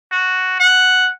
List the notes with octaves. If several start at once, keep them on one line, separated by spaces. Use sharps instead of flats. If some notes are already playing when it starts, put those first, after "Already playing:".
F#4
F#5